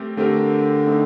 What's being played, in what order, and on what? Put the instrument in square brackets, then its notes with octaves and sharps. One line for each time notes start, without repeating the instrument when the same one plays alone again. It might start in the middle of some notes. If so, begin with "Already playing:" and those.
Already playing: [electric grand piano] A3 C4 G4 A#4
[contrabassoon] D3 [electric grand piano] A3 C4 G4 A#4
[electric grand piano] A3 C4 D#4